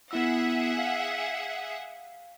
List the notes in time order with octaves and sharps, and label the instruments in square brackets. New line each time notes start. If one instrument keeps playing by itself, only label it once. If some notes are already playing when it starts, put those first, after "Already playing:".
[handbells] B3 E4 E6 [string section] G#4 E5 F#5
[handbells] F5